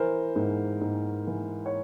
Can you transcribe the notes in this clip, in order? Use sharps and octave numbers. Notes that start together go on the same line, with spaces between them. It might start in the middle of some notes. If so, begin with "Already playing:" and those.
Already playing: E3 A#4 C5
G#2
G#2
E3
C#5